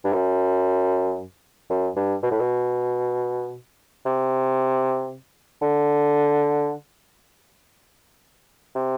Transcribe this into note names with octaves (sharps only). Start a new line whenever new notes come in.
G2
F#2
F#2
G2
B2
A2
B2
C3
D3
C3